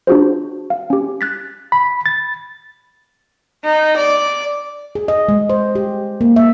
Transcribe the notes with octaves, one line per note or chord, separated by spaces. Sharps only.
D4 F4 F#4 G#4 C5
F5
C#4 G4
F#6 A6 B6
B5
A6
D#4
D5
G#4
D#5
G#3
C5
G4
A#3
E5